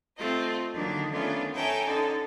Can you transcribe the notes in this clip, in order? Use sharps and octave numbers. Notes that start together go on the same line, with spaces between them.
A3 C4 F4 D#5
D3 D#3 F#3 A#3 D4
D#3 A3 B3 C#4 D4 F4
A4 C#5 E5 G5 G#5 A#5
D3 C#4 D#4 A4